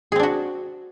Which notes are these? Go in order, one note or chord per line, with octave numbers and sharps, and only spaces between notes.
C4 D4 F#4 G#4